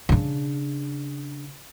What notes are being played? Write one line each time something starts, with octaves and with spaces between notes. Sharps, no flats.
C#3 D4